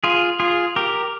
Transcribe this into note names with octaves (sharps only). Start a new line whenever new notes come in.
F4 G#4
F4 G#4
G4 A#4